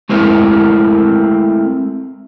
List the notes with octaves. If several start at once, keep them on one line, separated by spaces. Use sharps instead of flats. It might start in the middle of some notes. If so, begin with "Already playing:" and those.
G#3 A3 C4 E4 A#4